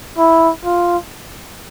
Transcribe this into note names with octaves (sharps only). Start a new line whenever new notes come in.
E4
F4